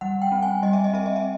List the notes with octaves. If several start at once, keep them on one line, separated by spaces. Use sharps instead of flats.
G3 F#5
G5
C4
G#5
G3 D#5
E5
D#5
C4 E5
D#5
E5